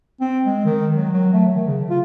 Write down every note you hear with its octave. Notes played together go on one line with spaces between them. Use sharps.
C4
G#3
D#3
F#3
F#3
A3
D#3
C#3
F4